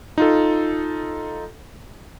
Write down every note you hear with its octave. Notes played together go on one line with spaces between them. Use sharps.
D#4 F4 A4